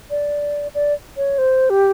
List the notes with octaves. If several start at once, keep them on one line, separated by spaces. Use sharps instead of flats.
D5
D5
C#5
C5
G4